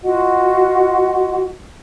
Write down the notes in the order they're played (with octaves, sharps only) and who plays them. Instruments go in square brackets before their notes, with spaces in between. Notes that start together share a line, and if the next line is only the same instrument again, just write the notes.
[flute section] F4 F#4 D#5 F#5